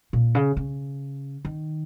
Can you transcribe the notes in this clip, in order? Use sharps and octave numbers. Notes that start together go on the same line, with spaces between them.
A#2
C#3
C#3
D#3